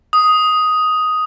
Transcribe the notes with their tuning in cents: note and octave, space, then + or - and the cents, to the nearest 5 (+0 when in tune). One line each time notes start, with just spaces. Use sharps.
D#6 +5